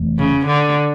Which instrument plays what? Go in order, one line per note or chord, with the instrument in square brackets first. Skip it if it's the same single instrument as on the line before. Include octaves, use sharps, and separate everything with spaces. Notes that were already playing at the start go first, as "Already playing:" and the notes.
Already playing: [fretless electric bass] F1 F2 E3 A3
[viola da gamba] C#3
D3